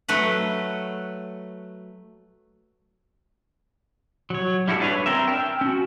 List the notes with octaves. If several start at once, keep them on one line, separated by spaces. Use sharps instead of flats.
F#3 A3 B4 F#5
F#3 C#5
G3 E4 F#4 G4 A4
D4 B4 C#5
C4 A#4 E5
G5 A5 E6 F6
C#4 F#4